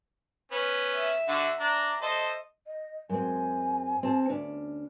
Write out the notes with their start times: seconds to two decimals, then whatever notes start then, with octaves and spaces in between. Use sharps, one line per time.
0.52 B3 C#4
0.96 E5
1.28 D3 F#4
1.60 D4 A#5
2.02 A4 C5 D#5
2.66 D#5
3.09 F#2 G#3 C4 G#5
4.03 C4 G#4 A5
4.29 D2 C#4 D4